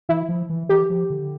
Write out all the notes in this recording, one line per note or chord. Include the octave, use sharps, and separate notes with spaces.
E3 E4
F3
E3
E3 G4
F3
D3